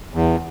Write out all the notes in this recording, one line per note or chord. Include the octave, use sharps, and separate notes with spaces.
E2